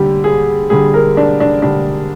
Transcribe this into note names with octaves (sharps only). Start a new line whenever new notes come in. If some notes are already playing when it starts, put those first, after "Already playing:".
Already playing: D3 G3 G4
G#4
D3 G3 G#4
A#4
D4
D4
D3 G3 D4